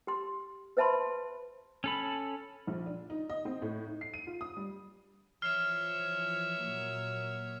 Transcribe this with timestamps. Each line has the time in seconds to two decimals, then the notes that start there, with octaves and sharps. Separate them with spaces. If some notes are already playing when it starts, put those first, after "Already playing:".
0.07 G4 C6
0.77 B4 C5 E5 A5 B5 C6
1.84 C#4 A4 B5
2.67 A#1
2.86 D4
3.10 D#4
3.30 D#5
3.45 C4
3.62 A2
3.86 D#4
4.01 C7
4.14 D#7
4.27 F4
4.41 D#6
4.57 G3
5.42 E3 F3 C#5 E5 F6 C7
6.61 A#2 F#3 A#3